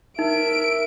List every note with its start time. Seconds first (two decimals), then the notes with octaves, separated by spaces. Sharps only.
0.19 D#4 A#4 E5 D7